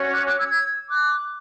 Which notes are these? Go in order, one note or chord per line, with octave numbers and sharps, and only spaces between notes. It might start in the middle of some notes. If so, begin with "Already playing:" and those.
Already playing: C#4 F#4 C#5
D6 F#6
D6 F#6
E6 G#6
E6 G#6
D6 F#6